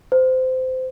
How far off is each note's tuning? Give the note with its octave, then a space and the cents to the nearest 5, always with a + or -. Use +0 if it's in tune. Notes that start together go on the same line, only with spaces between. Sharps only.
C5 -20